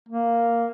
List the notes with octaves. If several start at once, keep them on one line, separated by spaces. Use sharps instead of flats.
A#3